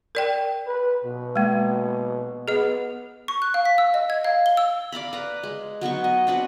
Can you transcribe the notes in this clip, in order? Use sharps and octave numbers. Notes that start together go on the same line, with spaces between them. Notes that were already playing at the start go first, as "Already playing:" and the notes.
A#4 D5 G5
B4
B2
G#3 A#3
B3 G#4 D#5
C#6
F#6
F5
B6
E6
D#5
G#6
F5
G7
E6
D5 F5 A#5 B5
B4 A#5
G#3
F#3 B3 D#4 C#6
D#5
C4 D4 F#4 B4